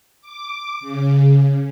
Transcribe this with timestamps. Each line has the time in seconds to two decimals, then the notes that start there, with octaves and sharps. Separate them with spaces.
0.21 D6
0.80 C#3